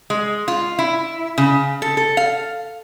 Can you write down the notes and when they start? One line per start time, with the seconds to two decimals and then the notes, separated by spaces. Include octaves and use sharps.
0.10 G#3
0.48 F4
0.79 E4
1.38 C#3
1.82 A4
1.97 A4
2.17 F5